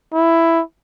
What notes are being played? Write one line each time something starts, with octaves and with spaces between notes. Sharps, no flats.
E4